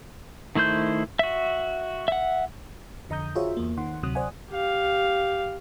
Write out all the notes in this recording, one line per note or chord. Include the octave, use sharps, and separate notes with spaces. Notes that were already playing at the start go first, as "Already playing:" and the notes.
D#3 A3 E4 C5 G6
F#4 E5
E5 F#5
F2 D3 D#5 A#5 D#6 G6
F4 F#4 G#4 C5 C#5 E5
E2 A#3
D#3 F#5 C6
D2 C3 F#3 D#6 F#6
C5 D5 F#5 G#5
G4 F5